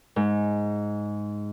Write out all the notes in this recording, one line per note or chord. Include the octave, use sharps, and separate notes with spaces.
G#2